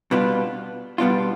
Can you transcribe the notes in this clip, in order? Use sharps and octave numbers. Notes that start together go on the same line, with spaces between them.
B2 G3 B3 D4 F4
B2 G3 B3 D4 F4